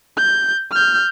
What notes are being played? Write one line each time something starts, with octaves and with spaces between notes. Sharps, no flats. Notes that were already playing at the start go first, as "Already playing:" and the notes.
G6
F6 G6